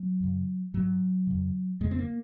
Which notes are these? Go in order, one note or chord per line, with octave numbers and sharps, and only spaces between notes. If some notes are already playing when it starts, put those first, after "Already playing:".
Already playing: F#3
F#2 C#3
G#2 F#3
F2 C#3
F2 C#3 G#3
C4
A#3